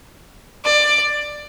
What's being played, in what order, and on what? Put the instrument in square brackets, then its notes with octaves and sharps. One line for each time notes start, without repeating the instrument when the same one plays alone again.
[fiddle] D5